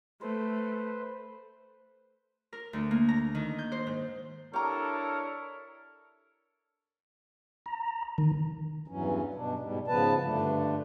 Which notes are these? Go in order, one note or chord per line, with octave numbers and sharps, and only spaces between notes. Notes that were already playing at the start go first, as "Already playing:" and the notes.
A3 B4 C5
A#4
D2
A#3
A#5
D#3
G6
C5
G#2
D4 E4 G4 A4 A#4 C#5 A#5
A#5
D#3
E2 G2 E3 F#3 C#4
G2 B2 D4
G#2 B2 G3
G#2 C#3 F3 B3 B4 A5
G2 D3 A3 D4